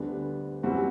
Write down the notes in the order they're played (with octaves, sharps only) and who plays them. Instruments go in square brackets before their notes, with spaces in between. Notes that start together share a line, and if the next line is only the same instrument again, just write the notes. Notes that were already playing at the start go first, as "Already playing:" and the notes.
Already playing: [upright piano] D2 D3 G3 B3 D4
F#2 E3 G3 C4 F#4